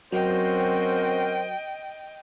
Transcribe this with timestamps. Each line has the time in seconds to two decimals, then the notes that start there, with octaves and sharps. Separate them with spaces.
0.12 F#3 C4 C#4 F#4 A#4 C5 D#5 G5